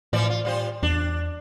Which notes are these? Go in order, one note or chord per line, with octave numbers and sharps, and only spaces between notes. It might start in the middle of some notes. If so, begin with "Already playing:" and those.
A2 E3 F3 D5
F4
G3 F4 C5
E2 D4